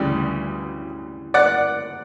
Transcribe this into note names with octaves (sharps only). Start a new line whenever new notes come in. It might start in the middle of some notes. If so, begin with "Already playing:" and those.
Already playing: D2 C#3 E3 G3
D5 F#5